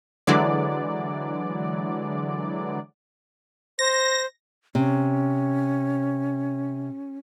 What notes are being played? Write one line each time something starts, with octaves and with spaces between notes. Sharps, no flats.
D3 E3 F#3 G#3 D5
C5 A#6
C3 C#4